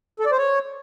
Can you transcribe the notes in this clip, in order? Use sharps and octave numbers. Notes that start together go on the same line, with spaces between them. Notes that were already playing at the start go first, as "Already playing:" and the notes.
A4
D5
C5
C#5